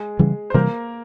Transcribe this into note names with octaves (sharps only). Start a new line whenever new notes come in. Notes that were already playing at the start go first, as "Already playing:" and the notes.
Already playing: G#3 G#4
C#3 E3 G3
C5
C3 E3 G3 A#3 A#4